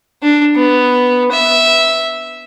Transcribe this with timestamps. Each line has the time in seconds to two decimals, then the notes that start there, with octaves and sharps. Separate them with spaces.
0.23 D4
0.56 B3
1.32 E5